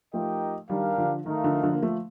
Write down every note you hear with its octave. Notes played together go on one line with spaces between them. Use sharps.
F3 A3 D#4 G4 A#4 D#5 G5
D#3 G3 D4 G4 A#4 F5
D3 F3
D#3 A3 D#4 A#4 F5
D3 F3
D3 F3
A#3
F3 A3